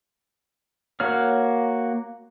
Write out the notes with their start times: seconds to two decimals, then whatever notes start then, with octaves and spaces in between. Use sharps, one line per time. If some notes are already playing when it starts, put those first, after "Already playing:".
1.00 A#3 F#4 C#5 F6